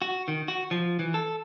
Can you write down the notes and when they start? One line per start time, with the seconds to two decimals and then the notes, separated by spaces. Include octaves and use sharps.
0.02 F#4
0.28 D#3
0.48 F#4
0.71 F3
0.99 E3
1.14 A4